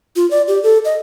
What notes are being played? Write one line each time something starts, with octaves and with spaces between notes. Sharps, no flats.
F4
D5
G4
A4
D#5